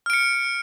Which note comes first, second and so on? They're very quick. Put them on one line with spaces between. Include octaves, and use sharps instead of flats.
F6 D7 C#7